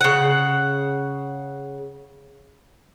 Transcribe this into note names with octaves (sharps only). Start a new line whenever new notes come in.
C#3 F#5